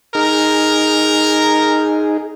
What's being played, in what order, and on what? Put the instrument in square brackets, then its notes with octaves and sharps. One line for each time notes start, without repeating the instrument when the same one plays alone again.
[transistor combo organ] D#4 G#4 [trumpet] A#4